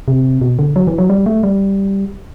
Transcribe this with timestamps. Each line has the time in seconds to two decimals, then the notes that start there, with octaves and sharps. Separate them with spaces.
0.08 C3
0.41 B2
0.59 D3
0.76 F#3
0.87 E3
0.98 F#3
1.10 G3
1.26 A3
1.43 G3